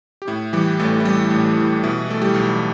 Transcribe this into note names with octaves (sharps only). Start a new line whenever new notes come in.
G4
A2 E4
E3 G3 G4
A1 A3 A4
E4
G3 A3 G4
A2
E3
B2 E4
A3 A4
G3 G4
B1